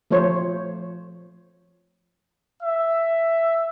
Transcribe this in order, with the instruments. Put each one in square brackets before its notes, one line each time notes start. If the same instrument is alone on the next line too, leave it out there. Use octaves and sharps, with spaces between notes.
[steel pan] F3 A3 F4 C5 C#5
[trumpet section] E5